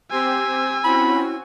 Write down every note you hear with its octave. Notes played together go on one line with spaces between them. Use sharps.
C4 G4 C5 G#5 E6
C4 C#4 E4 F#4 B5